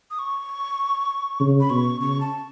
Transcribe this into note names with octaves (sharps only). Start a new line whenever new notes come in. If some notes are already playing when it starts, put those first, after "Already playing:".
D#6
C#6
C#3
B5
B2 C#6
C#3 C#6
A5